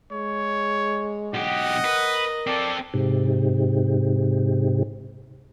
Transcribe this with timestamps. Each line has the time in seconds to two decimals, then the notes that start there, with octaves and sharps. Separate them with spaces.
0.12 G#3 C#5
1.34 B1 G4 D#5 F#5
1.84 A#4 B4
2.47 C4 A4 D5
2.94 G#2 C3